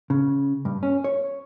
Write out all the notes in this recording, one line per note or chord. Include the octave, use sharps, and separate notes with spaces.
C#3
G2
C#4
C#5